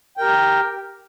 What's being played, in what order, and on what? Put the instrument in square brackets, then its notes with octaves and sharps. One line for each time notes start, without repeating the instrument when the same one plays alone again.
[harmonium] G5
A#4
G4